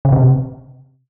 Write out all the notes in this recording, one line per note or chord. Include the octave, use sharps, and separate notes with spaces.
C#3
C3